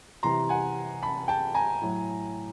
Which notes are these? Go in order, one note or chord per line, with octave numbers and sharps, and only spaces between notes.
C3 E3 G3 A#5 C6
F#5 G#5
A5 B5
G5 A5
G#5 A#5
A2 F#3